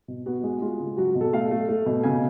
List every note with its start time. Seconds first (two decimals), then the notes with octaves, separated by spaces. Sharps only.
0.08 B2
0.26 B3 F#4
0.44 G#3
0.62 G#3 F4
0.80 C#3
0.97 F#3 F#4
1.15 B2
1.21 A4
1.33 A3 F5
1.51 A3
1.69 A3
1.86 B2
2.04 C#3 G#5